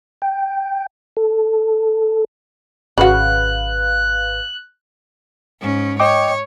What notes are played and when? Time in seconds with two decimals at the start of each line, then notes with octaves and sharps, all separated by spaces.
0.22 G5
1.17 A4
2.98 G#1 C#3 F#4 B4 F5 F#6
5.61 G#2 C#4
6.00 C#5 D#5 G5 D6